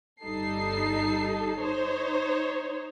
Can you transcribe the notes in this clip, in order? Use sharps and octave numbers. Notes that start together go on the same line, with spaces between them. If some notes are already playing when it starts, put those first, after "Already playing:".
G1 G3 D#4 A4 C7
D#4 C5 C#5